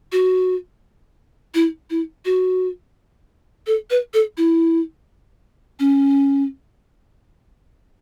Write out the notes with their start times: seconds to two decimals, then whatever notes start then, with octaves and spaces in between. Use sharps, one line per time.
0.12 F#4
1.55 E4
1.90 E4
2.25 F#4
3.67 A4
3.91 B4
4.14 A4
4.37 E4
5.80 C#4